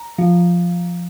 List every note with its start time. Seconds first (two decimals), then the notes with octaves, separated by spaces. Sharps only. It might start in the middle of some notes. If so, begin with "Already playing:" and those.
Already playing: A#5
0.18 F3